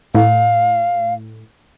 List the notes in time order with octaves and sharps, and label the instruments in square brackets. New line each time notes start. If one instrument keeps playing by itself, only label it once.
[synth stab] A2 [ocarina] F5